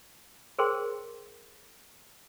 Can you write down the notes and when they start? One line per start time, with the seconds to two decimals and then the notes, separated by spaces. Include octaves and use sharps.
0.59 G#4 A#4 C5 C#5 G5 C6